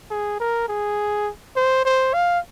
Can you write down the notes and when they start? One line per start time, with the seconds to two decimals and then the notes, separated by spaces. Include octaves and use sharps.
0.10 G#4
0.40 A#4
0.68 G#4
1.56 C5
1.85 C5
2.13 F5